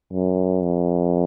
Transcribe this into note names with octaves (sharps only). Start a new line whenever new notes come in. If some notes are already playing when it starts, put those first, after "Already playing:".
F#2
F2